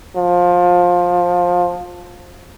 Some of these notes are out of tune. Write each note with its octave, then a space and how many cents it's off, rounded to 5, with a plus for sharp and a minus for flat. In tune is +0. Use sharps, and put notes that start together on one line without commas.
F3 +20